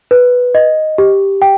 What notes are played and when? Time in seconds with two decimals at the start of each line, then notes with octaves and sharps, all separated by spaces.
0.11 B4
0.55 D#5
0.98 G4
1.42 G5